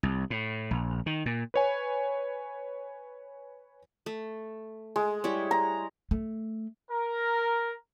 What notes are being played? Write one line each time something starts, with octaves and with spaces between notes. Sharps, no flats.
C2
A2
A#1
D#3
A#2
B4 C#5 G#5
A3
G#3
G3 E4 C#5
A#5
A3
A#4